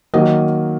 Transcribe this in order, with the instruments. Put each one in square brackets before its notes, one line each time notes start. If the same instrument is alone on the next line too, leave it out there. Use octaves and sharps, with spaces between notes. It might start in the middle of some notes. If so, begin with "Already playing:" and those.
[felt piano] D#3 F#3 A#3 D#5